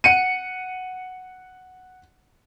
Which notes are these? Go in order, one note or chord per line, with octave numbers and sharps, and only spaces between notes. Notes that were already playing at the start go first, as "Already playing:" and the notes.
F#5 C#7 D#7